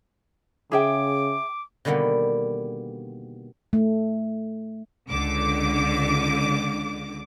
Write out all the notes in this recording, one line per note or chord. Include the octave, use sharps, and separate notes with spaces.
C#3 G#4 E5 G5 D6
B2 D3 D#3 G3 A#3 B3
A3
C#2 D3 D6